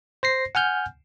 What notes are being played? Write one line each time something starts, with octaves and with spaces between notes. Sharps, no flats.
C5 A#6 C7
F#5 G#5 F6 G6